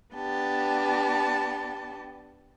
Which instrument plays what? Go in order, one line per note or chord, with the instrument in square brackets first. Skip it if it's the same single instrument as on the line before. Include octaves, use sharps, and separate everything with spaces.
[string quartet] B3 D4 G4 A5